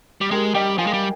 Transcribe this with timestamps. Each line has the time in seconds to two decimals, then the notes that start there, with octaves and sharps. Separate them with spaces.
0.21 G3
0.31 G#3 G4 A#4
0.55 G3 D#5 G5
0.78 F3 F5 G#5
0.87 G#3
0.93 G3